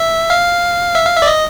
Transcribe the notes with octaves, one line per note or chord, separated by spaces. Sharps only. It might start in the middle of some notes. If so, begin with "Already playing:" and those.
Already playing: E5
F5
E5
F5
E5
D5
D#5